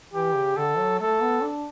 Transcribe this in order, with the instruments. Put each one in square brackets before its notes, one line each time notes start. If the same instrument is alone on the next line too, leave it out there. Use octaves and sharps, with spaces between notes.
[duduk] E3 [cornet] G4
[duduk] C#3
[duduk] D3 [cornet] A4
[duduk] F#3
[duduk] A3 [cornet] A4
[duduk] B3
D4